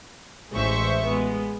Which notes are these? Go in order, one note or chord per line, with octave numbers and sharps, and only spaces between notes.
A1 G#3 C5 E5 C#6
G#3 B3